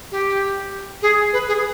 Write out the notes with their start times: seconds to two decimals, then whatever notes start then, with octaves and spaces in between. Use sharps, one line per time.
0.11 G4
1.02 G#4
1.33 B4
1.48 G#4